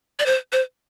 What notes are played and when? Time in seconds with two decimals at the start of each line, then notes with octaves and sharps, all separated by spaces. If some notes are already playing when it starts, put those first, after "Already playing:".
0.19 D5
0.26 C5
0.52 C5